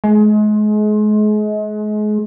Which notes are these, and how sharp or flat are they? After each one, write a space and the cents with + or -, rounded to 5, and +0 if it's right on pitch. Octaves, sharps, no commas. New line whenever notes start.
G#3 +35